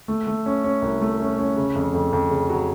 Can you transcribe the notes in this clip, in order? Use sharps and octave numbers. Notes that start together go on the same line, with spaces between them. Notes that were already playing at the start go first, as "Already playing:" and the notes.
A3
A3
C#4
C#4
C2
A3
C#4
C#4
C#3
F2
F2
F2
C#3
F#3